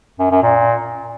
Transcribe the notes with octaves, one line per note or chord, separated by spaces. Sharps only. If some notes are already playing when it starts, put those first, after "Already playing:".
F#2
F#2
A#2